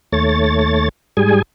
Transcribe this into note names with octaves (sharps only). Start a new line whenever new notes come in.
D#2 A3 C#5 A6
G#2 G3 G#4 G#5